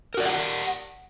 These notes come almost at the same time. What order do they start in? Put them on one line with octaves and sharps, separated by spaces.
A#4 F#4 D5 G4 F#5